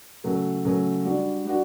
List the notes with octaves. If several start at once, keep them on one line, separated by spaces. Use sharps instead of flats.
C#3 F#3 A3
C#3 F#3 A3
G3 D4 F#4
G3 D4 F#4